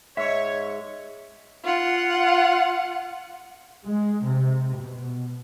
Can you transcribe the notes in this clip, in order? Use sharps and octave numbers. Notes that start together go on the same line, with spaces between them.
G#2 C#5 E5
F4 F#5
G#3
C3
B2